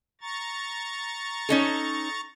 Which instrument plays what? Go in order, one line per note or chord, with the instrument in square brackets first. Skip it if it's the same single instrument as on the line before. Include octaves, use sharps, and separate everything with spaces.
[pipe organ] A#5 C#6 A6
[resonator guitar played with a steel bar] C#4 D#4 A4